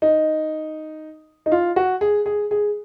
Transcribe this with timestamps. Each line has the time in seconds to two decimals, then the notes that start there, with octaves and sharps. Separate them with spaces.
0.02 D#4
1.46 D#4
1.52 F4
1.76 F#4
2.01 G#4
2.26 G#4
2.51 G#4